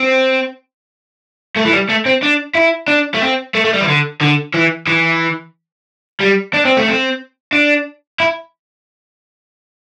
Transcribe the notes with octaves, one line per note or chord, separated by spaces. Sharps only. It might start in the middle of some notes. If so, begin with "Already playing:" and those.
Already playing: C4
A3
E3
G3
A3
C4
D4
E4
D4
A3
C4
A3
A3
G3
E3
D3
D3
E3
E3
G3
D4
C4
A3
C4
D4
E4